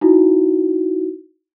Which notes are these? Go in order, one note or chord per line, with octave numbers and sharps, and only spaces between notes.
D#4 E4 F#4